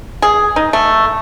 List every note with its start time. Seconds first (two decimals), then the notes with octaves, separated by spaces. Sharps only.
0.22 G#4
0.56 D#4
0.73 A3